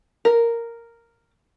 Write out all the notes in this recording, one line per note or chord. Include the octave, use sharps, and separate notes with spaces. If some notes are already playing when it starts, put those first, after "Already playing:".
A#4